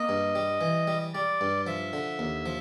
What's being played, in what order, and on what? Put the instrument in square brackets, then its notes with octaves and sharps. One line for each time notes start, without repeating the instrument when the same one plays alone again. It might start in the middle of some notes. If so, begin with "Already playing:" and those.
Already playing: [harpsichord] A#3 [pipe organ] D#5
[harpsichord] G2
G3
E3
G3
[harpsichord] G3 [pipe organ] D5
[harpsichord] G2
[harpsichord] F3 [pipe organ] E5
[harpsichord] D3
D#2
F3